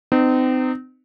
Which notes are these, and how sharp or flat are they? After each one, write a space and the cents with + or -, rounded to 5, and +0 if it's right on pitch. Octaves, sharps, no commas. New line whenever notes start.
C4 -35 D#4 -30